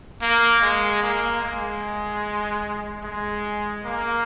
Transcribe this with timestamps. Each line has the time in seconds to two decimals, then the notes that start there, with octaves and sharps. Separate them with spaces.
0.22 A#3
0.62 G#3
1.03 A#3
1.43 G#3
3.04 G#3
3.85 A#3